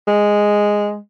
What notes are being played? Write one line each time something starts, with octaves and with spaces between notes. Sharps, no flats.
G#3